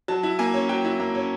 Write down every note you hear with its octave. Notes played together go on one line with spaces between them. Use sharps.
F#3 A5
E4
A#3 G#5
C#4
F#3 G5
E4
A#3
C#4